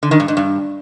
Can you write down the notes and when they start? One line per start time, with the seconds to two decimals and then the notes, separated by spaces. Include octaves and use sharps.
0.03 D3
0.11 D#3
0.20 G2
0.28 G#2
0.37 G2